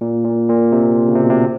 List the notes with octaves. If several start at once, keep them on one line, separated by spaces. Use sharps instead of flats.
A#2
A#2
A#2
C3
C#3
C3
B2
C3